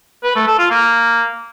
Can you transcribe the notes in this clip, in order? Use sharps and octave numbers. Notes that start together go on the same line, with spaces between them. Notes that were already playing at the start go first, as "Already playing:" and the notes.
B4
A3
A4
F4
A#3